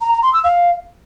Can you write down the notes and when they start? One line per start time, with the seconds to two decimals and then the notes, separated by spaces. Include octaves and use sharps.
0.01 A#5
0.12 A#5
0.22 C6
0.33 E6
0.44 F5